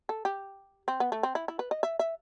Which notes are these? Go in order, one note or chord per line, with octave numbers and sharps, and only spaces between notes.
A4
G4
C4
B3
A3
C4
E4
E4
B4
D#5
E5
E5